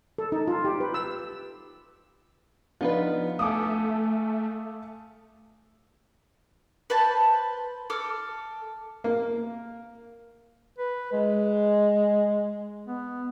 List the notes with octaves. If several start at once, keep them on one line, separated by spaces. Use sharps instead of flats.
A4
D#4
F4
G4
B4
E6
F3 B3 D4 D#4 F4 B4
A3 A4 F5 G#5 D6 D#6
B4 C5 A5
A4 D6 E6 F6
A#3
B4
G#3
B3